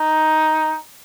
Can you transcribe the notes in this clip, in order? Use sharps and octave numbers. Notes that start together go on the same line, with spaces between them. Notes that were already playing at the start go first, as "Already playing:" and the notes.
Already playing: D#4